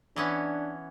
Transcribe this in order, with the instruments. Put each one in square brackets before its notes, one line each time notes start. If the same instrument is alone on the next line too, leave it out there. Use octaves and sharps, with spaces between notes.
[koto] E3 B3 C#4 [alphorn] D4